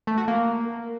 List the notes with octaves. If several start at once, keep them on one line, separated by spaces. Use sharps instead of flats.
A3
F#4
A#3